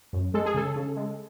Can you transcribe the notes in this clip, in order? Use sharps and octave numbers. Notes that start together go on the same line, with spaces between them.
F#2
G#3 A4
G#4
C#3 A4
C#3
G#3